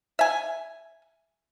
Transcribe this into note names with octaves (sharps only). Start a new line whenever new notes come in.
E5 G#5